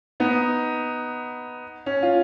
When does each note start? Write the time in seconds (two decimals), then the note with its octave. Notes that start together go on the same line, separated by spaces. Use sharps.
0.20 B3 D#4
1.86 C#4
2.03 F4